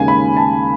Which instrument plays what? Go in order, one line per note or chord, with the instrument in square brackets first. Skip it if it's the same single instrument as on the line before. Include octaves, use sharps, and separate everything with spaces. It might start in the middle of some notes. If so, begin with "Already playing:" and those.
Already playing: [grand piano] D#2 C#3 G#3 G#5
B5
A5